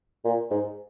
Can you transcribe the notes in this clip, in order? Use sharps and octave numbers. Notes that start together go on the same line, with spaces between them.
A#2
G#2